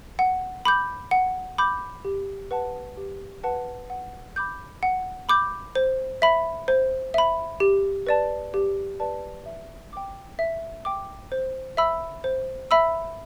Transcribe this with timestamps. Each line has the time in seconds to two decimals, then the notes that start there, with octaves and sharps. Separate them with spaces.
0.19 F#5
0.65 B5 D6 G6
1.11 F#5
1.58 B5 D6 G6
2.05 G4
2.51 B4 F#5 A5
2.97 G4
3.44 B4 F#5 A5
3.90 F#5
4.36 B5 D6 G6
4.83 F#5
5.29 B5 D6 G6
5.75 C5
6.22 E5 B5
6.68 C5
7.14 E5 B5
7.60 G4
8.07 B4 D5 A5
8.54 G4
9.00 B4 D5 A5
9.46 E5
9.93 G5 D6
10.39 E5
10.85 G5 D6
11.32 C5
11.77 E5 B5 E6
12.24 C5
12.71 E5 B5 E6